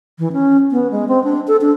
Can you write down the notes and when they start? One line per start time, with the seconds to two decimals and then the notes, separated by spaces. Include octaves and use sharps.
0.19 E3
0.33 C#4
0.72 B3
0.91 G#3
1.08 C4
1.24 D4
1.48 A4
1.61 D4